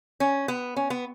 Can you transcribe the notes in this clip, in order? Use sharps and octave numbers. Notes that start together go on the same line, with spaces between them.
C#4
B3
C#4
B3